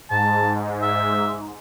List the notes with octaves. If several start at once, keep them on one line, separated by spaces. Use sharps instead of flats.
G#2 A5
E5